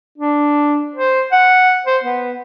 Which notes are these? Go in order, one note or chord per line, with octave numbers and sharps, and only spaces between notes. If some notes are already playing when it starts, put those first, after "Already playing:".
D4
C5
F#5
C5
B3